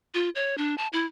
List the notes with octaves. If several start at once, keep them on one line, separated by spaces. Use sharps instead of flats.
F4
C#5
D4
A5
E4